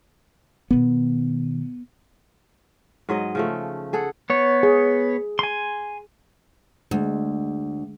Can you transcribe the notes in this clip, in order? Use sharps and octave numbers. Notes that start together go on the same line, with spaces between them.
B2 D#3 B3
G#2 F#3 D#5
C#3 F3 A3
G#4 A4 F#5
B3 C#5
G#4
G#5 C6
D2 G#3